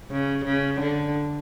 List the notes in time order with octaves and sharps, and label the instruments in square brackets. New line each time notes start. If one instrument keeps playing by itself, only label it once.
[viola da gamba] C#3
C#3
D3